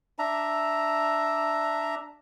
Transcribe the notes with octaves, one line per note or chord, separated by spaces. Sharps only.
D4 E5 A#5